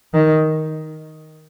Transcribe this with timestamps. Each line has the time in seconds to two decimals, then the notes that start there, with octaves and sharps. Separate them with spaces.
0.14 D#3